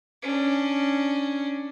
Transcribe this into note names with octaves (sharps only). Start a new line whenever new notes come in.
C#4 D4